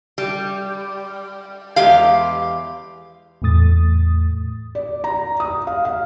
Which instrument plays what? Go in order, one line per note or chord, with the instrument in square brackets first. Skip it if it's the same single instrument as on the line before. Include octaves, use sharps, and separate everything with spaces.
[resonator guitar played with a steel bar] G3
E2 G#3 G4 F5
[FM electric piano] E2 A2 A3 D#6 A6
[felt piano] D5
A#5
D#6
F5
F5